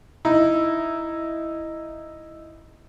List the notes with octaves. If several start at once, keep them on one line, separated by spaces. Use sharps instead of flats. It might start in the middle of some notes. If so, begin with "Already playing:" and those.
D#4 E4